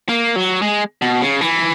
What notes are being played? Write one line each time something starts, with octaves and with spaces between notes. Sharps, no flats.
A#3
F#3
G#3
B2
C#3
E3